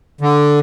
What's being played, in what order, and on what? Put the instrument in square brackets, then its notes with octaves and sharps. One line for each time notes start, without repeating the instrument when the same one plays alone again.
[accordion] D3